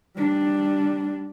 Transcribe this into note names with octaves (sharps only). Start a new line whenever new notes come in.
G3 D4